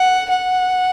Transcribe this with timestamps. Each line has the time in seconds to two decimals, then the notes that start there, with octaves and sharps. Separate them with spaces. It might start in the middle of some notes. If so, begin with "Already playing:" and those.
Already playing: F#5
0.30 F#5